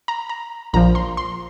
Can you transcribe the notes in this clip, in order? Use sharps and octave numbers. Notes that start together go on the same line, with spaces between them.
A#5
A#5
A#1 A#2 F3 A#5
C6
C6